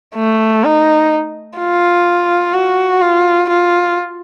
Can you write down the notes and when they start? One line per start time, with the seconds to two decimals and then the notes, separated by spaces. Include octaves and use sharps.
0.15 A3
0.64 D#4
1.58 F4
2.53 F#4
3.01 F4
3.49 F4